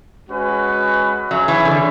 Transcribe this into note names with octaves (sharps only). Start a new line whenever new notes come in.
G#3 C#4 F#4 B4
F#3 C#4 G#4 C#5 E5
E3
D3